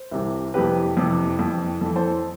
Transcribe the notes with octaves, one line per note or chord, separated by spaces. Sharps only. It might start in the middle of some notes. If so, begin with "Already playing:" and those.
Already playing: C5
C2 C3 E3
F2 C3 E3 G4 B4
F2 C3 E3
F2 E3
F2 E3 A4
A4 C5